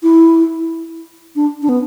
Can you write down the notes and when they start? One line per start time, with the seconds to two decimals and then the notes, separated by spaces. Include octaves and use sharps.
0.03 E4
1.36 D4
1.62 D4
1.69 B3